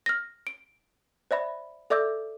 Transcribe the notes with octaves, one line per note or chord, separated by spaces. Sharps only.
F6 A#6
D7
C5 D5 E5 B5
A4 D5 E5 D6 E6 G6